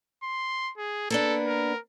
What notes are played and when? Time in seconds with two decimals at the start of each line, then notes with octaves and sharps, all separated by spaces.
0.23 C6
0.78 G#4
1.10 A#3 B3 D4 A4
1.46 A#4